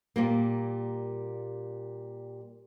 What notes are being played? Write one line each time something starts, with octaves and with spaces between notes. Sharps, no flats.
A#2 G3 A#3